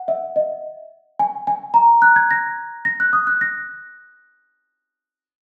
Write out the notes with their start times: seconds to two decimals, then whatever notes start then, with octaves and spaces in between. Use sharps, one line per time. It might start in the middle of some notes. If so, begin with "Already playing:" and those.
Already playing: F#5
0.08 E5
0.36 D#5
1.19 G#5
1.47 G#5
1.74 A#5
2.02 F#6
2.16 G#6
2.31 A#6
2.85 A#6
3.00 F#6
3.13 D#6
3.27 F#6
3.41 A#6